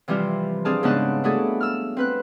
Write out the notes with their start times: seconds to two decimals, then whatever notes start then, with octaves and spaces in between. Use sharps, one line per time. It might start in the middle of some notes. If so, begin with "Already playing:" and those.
0.08 C3 E3 F3 G3 F4
0.65 C4 D4 G#4 F5 A5
0.83 G#2 C#3 B3 D4 A5 F#6
1.24 A3 D4 E4 F#4 G#4 A4
1.60 E6 F6
1.97 C4 B4 F#6